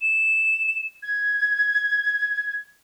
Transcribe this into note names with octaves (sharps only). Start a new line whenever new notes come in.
E7
G#6